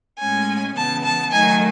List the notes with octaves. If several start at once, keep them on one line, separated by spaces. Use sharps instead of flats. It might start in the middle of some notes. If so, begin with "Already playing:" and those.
A2 G#3 C#4 G#5
C#3 E3 B3 A5
A5
D#3 F#3 A3 D#4 G#5